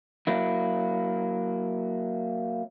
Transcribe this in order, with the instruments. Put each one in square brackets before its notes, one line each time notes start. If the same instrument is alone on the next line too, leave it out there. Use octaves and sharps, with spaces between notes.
[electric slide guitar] F#3 A#3 E4